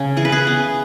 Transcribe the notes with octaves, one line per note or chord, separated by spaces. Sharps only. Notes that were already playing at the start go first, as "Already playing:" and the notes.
Already playing: C#3 C#4
E3 G#4
B4
G#4
B3